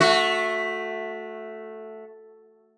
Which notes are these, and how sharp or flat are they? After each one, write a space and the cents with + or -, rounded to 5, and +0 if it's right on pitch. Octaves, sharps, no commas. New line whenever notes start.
A3 +0 F#4 -20